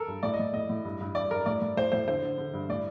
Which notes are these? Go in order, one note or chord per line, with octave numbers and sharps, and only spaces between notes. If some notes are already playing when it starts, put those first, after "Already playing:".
Already playing: A4 A#4
G2
A2 D5
D#5
A2
A2 D#5
A2
G2
G2
G2 D5
G2 A#4
A2 D5
A2
A2 C5
A2 C5
D3 C5
D3
D3
G2
A2 D5